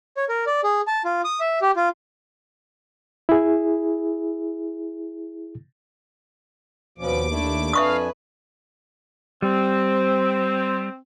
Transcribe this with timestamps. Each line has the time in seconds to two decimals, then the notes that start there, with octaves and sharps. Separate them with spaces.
0.17 C#5
0.29 A#4
0.46 D5
0.64 G#4
0.87 A5
1.05 F4
1.25 D#6
1.40 E5
1.62 G4
1.76 F4
3.29 E4 G#4
6.98 D#2 B2 F3 C#4 B4 D6
7.29 A3 D4 E4
7.73 F2 D4 B4 E5 F5 G#5 C#6 D#6
9.42 G3 C4